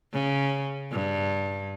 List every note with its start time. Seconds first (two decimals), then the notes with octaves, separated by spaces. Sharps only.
0.12 C#3
0.91 G2